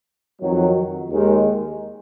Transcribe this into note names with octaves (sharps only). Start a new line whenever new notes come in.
F2 D#3 F#3
D#2 D#3 G#3